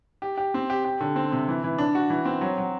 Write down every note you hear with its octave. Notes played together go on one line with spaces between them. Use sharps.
G4
G4
C4
G4
G4
D3
C4
C3
E3
E3
D4
F#4
E3
C4
F#3
F#3